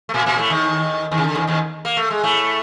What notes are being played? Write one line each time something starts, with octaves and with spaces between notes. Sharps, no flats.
A3
A#2 A#3
A#2 A#3
A2 A3
D#2 D#3
D#2 D#3
C#3
D3
D#2 D#3
D#2 D#3
A#3
A3
G#3
A2 A3